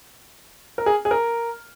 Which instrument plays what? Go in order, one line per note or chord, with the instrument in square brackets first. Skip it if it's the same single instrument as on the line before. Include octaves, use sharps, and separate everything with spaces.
[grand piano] A#4
G#4
G#4
A#4